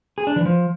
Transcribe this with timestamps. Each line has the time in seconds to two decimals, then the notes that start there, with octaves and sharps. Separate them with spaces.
0.18 G#4
0.27 D4
0.36 E3
0.45 F3